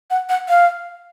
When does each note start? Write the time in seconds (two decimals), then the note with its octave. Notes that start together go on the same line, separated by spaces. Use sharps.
0.10 F#5
0.29 F#5
0.49 F5